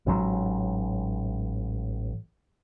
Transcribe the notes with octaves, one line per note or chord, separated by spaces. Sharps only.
A1 G#2 F#3